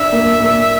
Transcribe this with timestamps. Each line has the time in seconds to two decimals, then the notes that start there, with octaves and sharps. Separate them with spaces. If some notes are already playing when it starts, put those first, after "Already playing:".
Already playing: D4 E5
0.12 A#3
0.40 A#3